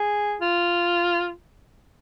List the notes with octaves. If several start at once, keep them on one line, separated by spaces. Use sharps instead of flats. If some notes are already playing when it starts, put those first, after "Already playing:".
Already playing: G#4
F4